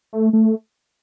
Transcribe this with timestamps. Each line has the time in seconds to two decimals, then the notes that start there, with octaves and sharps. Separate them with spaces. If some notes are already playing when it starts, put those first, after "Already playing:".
0.13 A3
0.33 A3